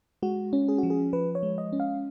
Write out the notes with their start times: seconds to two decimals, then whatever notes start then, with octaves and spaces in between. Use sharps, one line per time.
0.22 G#3 F#4
0.53 C#4
0.68 G#4
0.78 F3 F#4
0.90 G#4
1.13 F3 B4
1.35 C#5
1.43 G#3
1.58 D#5
1.73 C#4
1.80 F5